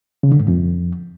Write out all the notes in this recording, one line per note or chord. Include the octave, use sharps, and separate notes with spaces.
C#3
D3
G#2
F2